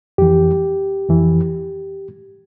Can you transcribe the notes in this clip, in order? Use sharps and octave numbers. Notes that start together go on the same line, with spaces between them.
F2 E3 G4
F2 E3